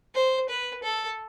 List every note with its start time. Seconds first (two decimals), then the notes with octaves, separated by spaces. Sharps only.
0.15 C5
0.49 B4
0.83 A4